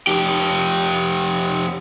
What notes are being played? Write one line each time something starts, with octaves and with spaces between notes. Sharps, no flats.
F2 G4